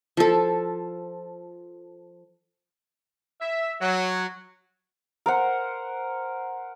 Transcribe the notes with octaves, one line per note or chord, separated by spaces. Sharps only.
F3 A4
E5
F#3
A#4 C5 F#5